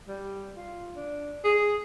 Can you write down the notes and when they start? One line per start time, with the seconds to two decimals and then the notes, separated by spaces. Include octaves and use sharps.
0.08 G3
0.57 F4
0.96 D4
1.45 G#4